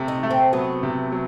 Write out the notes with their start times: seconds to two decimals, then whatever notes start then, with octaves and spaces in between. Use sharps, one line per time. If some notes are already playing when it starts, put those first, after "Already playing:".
Already playing: C3 A3
0.08 D#4
0.23 A3
0.31 C4
0.53 F#3 B3
0.83 C3
1.12 F#3